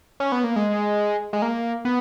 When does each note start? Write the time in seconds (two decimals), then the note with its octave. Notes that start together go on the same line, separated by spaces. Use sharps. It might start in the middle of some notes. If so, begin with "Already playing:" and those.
0.20 C#4
0.32 B3
0.44 A#3
0.56 G#3
1.33 G#3
1.42 A#3
1.85 B3